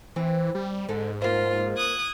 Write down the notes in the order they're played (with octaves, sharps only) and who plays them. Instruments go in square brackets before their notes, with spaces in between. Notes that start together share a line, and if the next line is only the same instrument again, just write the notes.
[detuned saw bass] E3 [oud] C4
[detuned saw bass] G3
[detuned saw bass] G#2 [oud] D3 A4
[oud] A#3 C5 [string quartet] F4
[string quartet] D#6 F#6 G#6